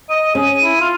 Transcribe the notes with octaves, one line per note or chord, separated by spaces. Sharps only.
D#5 D#7
C#4 G#4
E4
F4